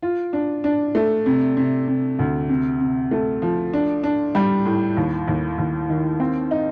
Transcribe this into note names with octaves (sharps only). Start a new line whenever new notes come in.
F4
D4
D4
A3
C3
C3
C3
D2
C3
C3
A3
F3
D4
D4
G3
A2
D#2
D#2
D#2
D#3
C4
D#4